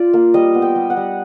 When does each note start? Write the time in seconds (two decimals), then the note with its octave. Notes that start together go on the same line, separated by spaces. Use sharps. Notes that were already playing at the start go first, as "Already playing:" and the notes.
Already playing: F4 D5
0.13 A#3
0.34 G3 D#5
0.54 B3
0.62 G5
0.76 G3
0.90 F#5
0.97 G3